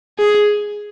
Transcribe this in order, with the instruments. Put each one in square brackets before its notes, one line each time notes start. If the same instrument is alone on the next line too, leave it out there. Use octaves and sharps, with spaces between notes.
[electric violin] G#4